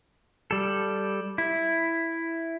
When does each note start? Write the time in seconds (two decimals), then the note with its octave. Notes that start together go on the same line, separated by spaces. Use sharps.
0.51 G3 A4
1.38 E4